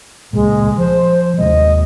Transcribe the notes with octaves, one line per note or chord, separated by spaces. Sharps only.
C#2 A#2 G#3
F3 C5
D#2 C3 G#3 D#5